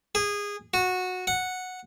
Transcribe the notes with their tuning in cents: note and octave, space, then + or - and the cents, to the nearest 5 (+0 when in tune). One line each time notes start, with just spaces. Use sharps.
G#4 -20
F#4 -15
F#5 -5